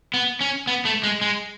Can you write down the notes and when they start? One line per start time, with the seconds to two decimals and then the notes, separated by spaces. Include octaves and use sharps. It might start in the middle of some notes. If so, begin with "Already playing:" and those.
0.14 B3
0.41 C#4
0.67 B3
0.85 A3
1.03 G#3
1.21 G#3